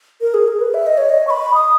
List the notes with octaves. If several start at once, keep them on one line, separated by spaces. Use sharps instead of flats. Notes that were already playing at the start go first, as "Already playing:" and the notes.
A#4
G#4
A#4
B4
E5
D#5
C#5
D#5
C#6
B5
D#6